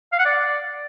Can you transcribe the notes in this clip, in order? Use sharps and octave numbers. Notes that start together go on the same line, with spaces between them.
F5
F#5
D5